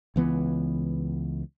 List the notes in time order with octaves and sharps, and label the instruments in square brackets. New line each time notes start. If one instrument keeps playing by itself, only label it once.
[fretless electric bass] C#2 E3 B3